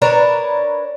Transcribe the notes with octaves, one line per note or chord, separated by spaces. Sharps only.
D4 A#4 B4 C#5